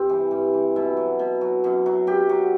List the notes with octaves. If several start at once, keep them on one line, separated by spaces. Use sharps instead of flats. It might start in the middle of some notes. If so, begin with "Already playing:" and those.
Already playing: G2 C4
E3
G2
E3
B2 E4
F#3
B2
F#3
F#2
F#3
F#2 G4
F#3